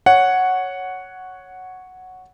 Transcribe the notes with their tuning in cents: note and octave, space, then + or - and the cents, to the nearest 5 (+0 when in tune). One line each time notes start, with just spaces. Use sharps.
C#5 +0 F#5 +0